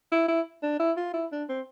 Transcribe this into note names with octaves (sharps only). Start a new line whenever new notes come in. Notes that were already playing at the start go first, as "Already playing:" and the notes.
E4
E4
D4
E4
F4
E4
D4
C4